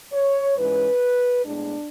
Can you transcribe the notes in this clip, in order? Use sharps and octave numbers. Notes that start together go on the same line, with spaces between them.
C#5
G#2 E3 G#3 C#4 B4
A2 G#3 B3 D4